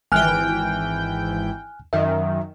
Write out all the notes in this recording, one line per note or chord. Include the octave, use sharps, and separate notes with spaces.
G#1 E3 G5 G#5 F6 F#6
F#2 D#3 E5